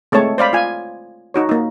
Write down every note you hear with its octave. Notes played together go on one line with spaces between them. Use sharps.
G#3 A3 C4 C#5 A5
C5 D5 F5 B5
F4 G#5
D#4 F#4 C#5
A#3 D#4